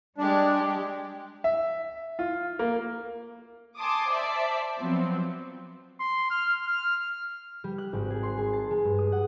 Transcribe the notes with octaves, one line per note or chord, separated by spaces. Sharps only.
G3 G#3 D4 G4
E5
F4
A#3
G#5 A5 C6 D6 D#6
C5 D5 E5 A5
F3 F#3 B3 C4
C6
F6
F6
G3
F#6
G#1
G#4
C6
G#4
A5
G#3
G2
D#6
F#5